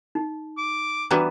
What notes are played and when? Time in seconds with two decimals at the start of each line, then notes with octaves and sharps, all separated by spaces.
0.15 D#4
0.58 D6
1.11 E3 G3 B3 D4 F#4 A#5